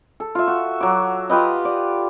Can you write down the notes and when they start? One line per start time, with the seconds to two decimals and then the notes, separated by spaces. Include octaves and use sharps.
0.20 A4
0.35 F4 E5
0.48 F#4
0.81 F#3 D6
1.30 F4 G4 B4 D#5
1.65 D5